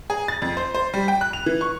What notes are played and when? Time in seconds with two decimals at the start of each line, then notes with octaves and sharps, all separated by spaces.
0.10 G#4
0.28 A6
0.42 F2
0.57 C5
0.75 C5
0.94 G3
1.08 G5
1.21 F#6
1.33 F7
1.46 E3
1.61 C#6